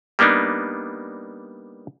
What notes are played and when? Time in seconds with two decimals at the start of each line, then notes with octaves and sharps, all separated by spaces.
0.19 G3 A#3 B3 D4 D#4